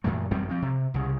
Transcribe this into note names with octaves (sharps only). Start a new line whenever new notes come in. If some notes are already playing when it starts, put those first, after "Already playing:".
F#2 A#2 E3 A3
A1 F#2 G3 C4
F3 C4
C3
C2 C#3